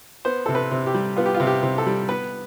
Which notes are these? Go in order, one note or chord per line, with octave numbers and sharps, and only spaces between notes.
B3 C5
C3 A4
B4
C3
G4
G3
B3 F4
G4
F4
C3
G4
C3
A4
G3
B3 B4